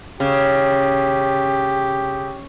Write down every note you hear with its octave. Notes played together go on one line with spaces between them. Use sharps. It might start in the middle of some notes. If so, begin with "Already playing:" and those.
C#3 G4